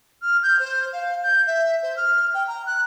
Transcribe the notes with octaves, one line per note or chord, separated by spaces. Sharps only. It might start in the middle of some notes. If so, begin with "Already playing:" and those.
F6
G6
C5
F5
G6
E5
C5
F6
G5
A#5
F#6